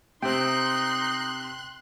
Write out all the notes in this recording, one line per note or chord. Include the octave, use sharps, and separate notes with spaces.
C3 C4 D#4 G5 C6 F#6